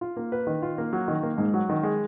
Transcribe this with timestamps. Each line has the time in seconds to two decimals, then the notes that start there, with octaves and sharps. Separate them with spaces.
0.01 F4
0.17 A#3
0.32 B4
0.47 D#3
0.62 F4
0.78 A#3
0.93 F#3
1.08 D#3
1.23 A#3
1.38 G#2
1.54 F#3
1.69 D#3
1.83 G#3